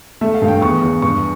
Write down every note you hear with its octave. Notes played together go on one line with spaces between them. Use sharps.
A3 E5
F5
G2
G5
E2 C#6
E2
G2 C#6